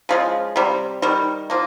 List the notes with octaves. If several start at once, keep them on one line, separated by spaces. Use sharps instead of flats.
C#3 F3 G#3
C3 G3
D#3 G3
F3 A#3